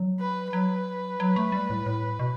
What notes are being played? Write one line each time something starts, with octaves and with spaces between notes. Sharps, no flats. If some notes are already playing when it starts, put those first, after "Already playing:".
Already playing: F#3
B4
F#3 B4
F#3
A3
G3
A2
A2
B2